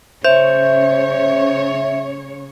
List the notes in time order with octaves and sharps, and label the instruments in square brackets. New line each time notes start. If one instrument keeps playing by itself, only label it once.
[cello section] C#3 C#5 [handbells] C5 [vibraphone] E5